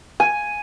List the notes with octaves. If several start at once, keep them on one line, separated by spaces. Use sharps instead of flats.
G#5